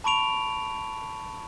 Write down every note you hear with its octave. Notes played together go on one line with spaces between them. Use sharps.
A5 B5 C#6 D7 F7